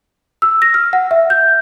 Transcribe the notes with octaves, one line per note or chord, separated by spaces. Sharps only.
E6
A#6
F6
F#5
E5
G6